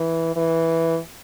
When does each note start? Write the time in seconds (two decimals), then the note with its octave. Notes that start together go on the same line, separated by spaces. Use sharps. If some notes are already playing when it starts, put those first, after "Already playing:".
Already playing: E3
0.36 E3